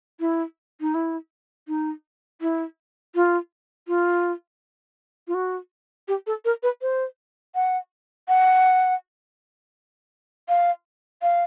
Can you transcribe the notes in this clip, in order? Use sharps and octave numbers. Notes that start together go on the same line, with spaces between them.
E4
D#4
E4
D#4
E4
F4
F4
F4
F#4
G4
A4
A#4
B4
C5
F#5
F#5
F5
F5